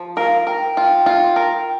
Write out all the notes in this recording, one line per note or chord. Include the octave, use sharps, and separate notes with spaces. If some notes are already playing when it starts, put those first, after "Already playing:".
Already playing: F3
A#4 F5
A#4 G5
F4
F4
A#4